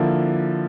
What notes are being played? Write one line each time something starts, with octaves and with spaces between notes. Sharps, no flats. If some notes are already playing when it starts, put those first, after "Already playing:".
Already playing: D3 F3 A#3 E4